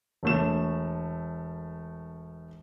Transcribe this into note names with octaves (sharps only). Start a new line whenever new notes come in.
E1 A3 E7